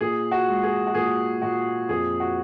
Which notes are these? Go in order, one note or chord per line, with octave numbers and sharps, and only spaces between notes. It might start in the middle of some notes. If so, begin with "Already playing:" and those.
A#2 G#4
F#4
G#3
G#4
F#4
A#2 G#4
A#2 F#4
F2 G#4
F#4